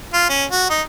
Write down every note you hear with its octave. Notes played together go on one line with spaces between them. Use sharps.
F4
C#4
F#4
D#4